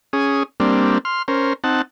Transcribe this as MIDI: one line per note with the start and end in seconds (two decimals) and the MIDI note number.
0.13 0.43 61
0.13 0.43 68
0.13 0.43 87
0.60 0.98 55
0.60 0.98 58
0.60 0.98 60
0.60 0.98 62
1.05 1.22 84
1.05 1.22 89
1.28 1.53 61
1.28 1.53 70
1.28 1.53 72
1.64 1.82 60
1.64 1.82 63
1.64 1.82 78
1.64 1.82 81